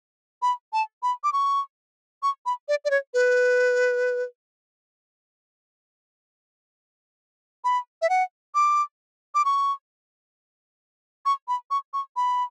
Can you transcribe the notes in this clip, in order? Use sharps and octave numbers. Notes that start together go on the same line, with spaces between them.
B5
A5
B5
D6
C#6
C#6
B5
D5
D5
C#5
B4
B5
E5
F#5
D6
D6
C#6
C#6
B5
C#6
C#6
B5